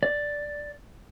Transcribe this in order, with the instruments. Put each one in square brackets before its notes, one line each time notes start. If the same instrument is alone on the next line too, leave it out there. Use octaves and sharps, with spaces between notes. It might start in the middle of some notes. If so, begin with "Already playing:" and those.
[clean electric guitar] D5